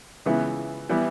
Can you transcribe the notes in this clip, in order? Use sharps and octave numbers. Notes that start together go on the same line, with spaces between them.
C#2 C#3 E3 B3 E4
E3 G3 B3 E4